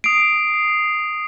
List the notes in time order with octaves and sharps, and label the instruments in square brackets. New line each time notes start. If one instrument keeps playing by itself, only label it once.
[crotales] D#6 C7 [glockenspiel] D7